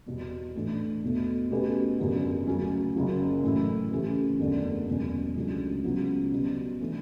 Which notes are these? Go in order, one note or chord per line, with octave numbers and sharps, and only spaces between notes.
E2 B2 G3
A2 E3 A3 D4
E2 B2 A3
B2 A3 C#4 G4 B4
F#1 F#2 D3 G3 B3
D2 C#3 F#3 C#4
F#1 F#2 C#3 F#3
A2 E3 A3 E4
C#3 E3 A3 C#4 G4
F#1 E2 D3 A3
E1 E2 B2 F#3 C#4
C#2 C#3 F#3 A3 D4
C#2 C#3 F#3 B3
B2 G3 B3
E3 A3 D4